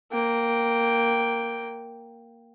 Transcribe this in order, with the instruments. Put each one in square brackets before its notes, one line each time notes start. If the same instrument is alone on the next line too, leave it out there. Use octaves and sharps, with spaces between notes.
[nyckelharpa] A#3 G5